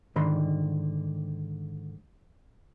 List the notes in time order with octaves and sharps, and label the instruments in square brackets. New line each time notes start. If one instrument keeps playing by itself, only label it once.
[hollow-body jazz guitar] G#2 D3 D#3 B5 C6